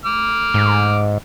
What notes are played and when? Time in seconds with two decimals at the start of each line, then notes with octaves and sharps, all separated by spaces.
0.06 D6 F6
0.54 G#2